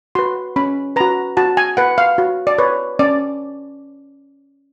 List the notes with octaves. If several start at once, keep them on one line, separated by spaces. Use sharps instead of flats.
F#4 B4 C6
C#4 B5
F#4 B4 A#5
F#4 A5
G#5
B4 F#5
F5
F#4
D5
B4 C#5
C#4 D5